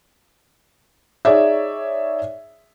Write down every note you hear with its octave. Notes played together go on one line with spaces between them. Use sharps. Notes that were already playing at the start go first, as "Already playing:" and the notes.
D#4 G#4 C#5 D5 E5